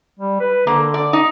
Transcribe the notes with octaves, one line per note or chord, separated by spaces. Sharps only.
G3
B4
D3 A#3
D5
D#4